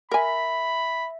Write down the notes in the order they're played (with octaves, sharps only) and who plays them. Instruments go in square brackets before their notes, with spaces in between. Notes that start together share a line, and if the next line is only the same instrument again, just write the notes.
[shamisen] A#4 G#5 [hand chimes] E5 B6 [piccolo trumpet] B5